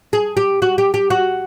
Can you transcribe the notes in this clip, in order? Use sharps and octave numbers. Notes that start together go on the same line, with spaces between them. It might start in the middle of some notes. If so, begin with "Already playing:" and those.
G#4
G4
F#4
G4
G4
F#4